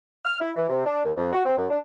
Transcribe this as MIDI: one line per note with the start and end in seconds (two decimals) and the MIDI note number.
0.25 0.37 89
0.40 0.50 64
0.56 0.66 52
0.69 0.82 48
0.85 1.02 62
1.04 1.11 39
1.16 1.31 41
1.32 1.43 66
1.45 1.55 60
1.58 1.65 42
1.70 1.78 62